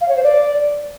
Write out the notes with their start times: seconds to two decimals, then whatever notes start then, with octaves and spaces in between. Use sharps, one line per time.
0.01 F5
0.08 C#5
0.16 C5
0.23 D5